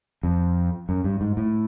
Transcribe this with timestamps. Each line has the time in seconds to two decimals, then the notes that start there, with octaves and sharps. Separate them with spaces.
0.23 F2
0.89 F#2
1.04 G2
1.21 G#2
1.37 A2